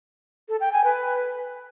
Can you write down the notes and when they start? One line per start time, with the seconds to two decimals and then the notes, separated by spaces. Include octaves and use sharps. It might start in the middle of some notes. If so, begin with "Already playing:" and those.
0.49 A4
0.61 G5
0.72 G#5
0.84 B4